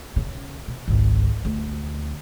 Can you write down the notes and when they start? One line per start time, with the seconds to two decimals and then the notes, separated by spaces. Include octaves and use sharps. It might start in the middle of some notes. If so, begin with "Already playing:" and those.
0.16 C#3
0.68 C3
0.88 G#1 C#2
1.45 D2